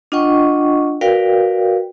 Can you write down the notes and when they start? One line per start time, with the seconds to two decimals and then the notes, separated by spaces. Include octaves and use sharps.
0.12 D4 F4 D#5 F#5 G5 C#6
1.01 F#4 A#4 B4 D5 F5 G5